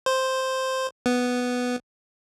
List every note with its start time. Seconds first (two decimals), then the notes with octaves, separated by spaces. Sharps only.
0.06 C5
1.06 B3